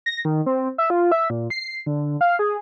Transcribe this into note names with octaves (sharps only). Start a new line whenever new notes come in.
A#6
D#3
C4
E5
F4
E5
A#2
C7
D3
F5
G#4